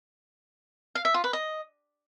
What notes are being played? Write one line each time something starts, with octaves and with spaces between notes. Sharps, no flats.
F5
E5
F4
B4
D#5